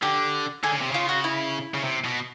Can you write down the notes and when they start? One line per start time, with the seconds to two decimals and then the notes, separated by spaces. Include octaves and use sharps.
0.02 D3 G4
0.63 D3 G#4
0.72 C#3
0.81 C3
0.91 C#3 F4
1.09 F#4
1.24 E4
1.74 C#3
1.84 C3
2.04 B2